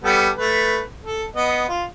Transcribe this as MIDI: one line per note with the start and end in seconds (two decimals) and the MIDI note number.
0.04 0.30 55
0.04 0.30 59
0.04 0.30 69
0.37 0.81 57
0.37 0.81 71
1.04 1.25 69
1.36 1.65 59
1.36 1.65 75
1.68 1.84 65